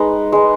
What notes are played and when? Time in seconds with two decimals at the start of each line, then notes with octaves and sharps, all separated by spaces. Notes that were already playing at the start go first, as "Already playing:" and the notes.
Already playing: G#3 D#4 B4
0.32 G#3 D#4